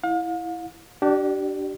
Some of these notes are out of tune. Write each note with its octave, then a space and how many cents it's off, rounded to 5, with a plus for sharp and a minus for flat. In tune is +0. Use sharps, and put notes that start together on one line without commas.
E4 +0 F5 +40
D4 +0 G4 -35 D5 +45